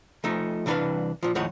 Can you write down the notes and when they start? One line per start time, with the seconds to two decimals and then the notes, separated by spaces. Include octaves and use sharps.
0.24 F3 A3 D#4
0.66 C2 E3 D4 A#4 B4 F5
1.23 A#2 F3
1.35 D#2 A2 F3 D#4 C#5 F#5